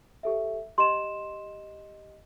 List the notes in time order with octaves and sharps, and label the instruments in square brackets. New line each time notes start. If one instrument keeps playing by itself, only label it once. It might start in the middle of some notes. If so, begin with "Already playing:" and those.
[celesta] G4 A4 E5
[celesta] G4 D#5 E7 [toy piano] C6